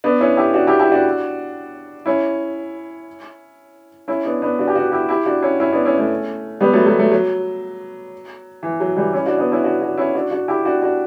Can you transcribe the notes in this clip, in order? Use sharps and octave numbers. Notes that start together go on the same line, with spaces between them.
B3 D4
C#4 E4
E4 G4
D4 F#4
E4 G4
E4 G4
D4 F#4
C#4 E4
C#4 E4
B3 D4
B3 D4
D4 F#4
G4
D4 F#4
E4 G4
E4 G4
D4 F#4
C#4 E4
C#4 E4
B3 D4
C#4 E4
A3 C#4
G3 B3
F#3 A3
F#3 A3
F#3 A3
F#3
E3
F#3
E3 G3
C#4 E4
D4 F#4
B3 D4
C#4 E4
D4 F#4
D4 F#4
C#4 E4
D4 F#4
D4 F#4
E4 G4
D4 F#4
D4 F#4